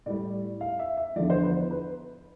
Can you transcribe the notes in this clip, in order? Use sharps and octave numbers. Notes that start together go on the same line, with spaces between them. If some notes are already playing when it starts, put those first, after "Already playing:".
A2 G3 D5
F5
E5
E5
E2 D3 F3 D5
C5
B4
B4